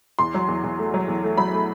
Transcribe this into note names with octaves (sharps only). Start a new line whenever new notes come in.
E2 C6
F#3
E2
E2
A3
F#3
E2
A3
F#3 B5
A3